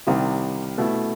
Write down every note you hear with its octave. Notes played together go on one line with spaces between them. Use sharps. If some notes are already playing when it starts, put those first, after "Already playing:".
C2 C3 D#3
B2 A3 E4